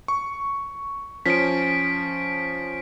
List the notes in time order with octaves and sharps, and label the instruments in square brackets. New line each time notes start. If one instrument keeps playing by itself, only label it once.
[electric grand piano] C#6
[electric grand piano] F3 C#4 [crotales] B6 D7